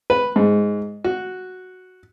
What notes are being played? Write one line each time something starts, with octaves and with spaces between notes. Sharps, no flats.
B4
G#2
F#4